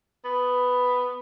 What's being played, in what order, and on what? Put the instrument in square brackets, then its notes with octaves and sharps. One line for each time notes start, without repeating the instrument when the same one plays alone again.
[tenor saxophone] B3